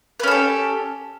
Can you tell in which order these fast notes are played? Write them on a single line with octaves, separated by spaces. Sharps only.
B4 C#4 A4 G4